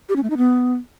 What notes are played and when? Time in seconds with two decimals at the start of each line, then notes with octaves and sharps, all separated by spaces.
0.09 G4
0.16 C#4
0.23 A3
0.30 D#4
0.37 B3